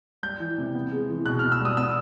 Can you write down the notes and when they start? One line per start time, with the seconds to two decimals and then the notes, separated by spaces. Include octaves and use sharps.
0.23 G3 G6
0.40 E3
0.58 C3
0.75 B3
0.91 G#3
1.09 E3
1.26 B2 F#6
1.39 B3 F6
1.52 E6
1.61 G3 D#6
1.77 B3 E6